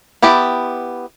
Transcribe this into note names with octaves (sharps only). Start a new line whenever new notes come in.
B3 E4 G4 A5